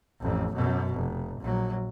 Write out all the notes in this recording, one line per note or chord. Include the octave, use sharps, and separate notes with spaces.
A1 F2
F#2 B2
F1
A#1 F#3